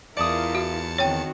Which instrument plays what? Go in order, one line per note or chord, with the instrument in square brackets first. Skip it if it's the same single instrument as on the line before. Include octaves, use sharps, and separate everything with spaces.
[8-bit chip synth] E2 A5 C#7 [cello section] E4 F4 A#4 [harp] D5 D#6
[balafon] F#4
[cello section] D#3 C4 F#4 [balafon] C#5 G5